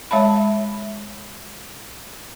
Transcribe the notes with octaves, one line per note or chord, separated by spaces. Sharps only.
G#3 C#5 E5 F5 A5 B5